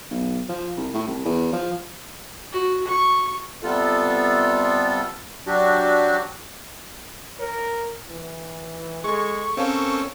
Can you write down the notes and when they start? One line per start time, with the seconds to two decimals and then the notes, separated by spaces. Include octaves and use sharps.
0.11 B1
0.49 F3
0.77 C2
0.94 A2
1.07 C2
1.25 E2
1.52 F3
2.52 F#4
2.87 C#6
3.63 C3 G3 B3 F4 A4
5.47 F#3 D4 F#4 G4
7.39 A#4 C#5
8.09 E3
9.04 G#3 G#4 A4 C#6
9.57 A#3 C4 C#4 A4 F5